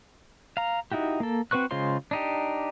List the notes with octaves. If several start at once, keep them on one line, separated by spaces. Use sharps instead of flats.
F5 A#5
D#4 E4 F#4 G4
A#3 A4
C4 F#4 B4 C#6 F#6
C#3 G#3 F4 C5 C6
D4 D#4 G4